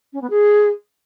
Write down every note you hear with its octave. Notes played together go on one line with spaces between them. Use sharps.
C#4
B3
G#4